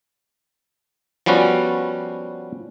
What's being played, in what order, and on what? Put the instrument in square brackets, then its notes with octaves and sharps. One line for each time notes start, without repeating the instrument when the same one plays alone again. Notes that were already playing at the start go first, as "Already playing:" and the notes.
[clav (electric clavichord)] F3 G3 B3 C#4 F#4